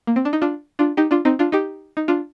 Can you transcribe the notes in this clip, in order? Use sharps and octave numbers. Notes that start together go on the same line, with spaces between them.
A#3
C4
D4
D#4
D4 F4
D4 F4
D#4 G4
D4 F4
C4 D#4
D4 F4
D#4 G4
D#4
D4 F4